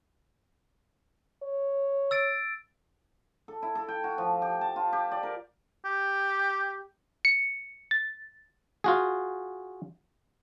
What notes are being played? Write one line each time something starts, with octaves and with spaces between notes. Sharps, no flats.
C#5
E6 A6 D7
A4
E4
A4
G5
F#4
F3
G4
A5
F4
G4
D5
A#4
G4
C#7
A6
F4 F#4 G#4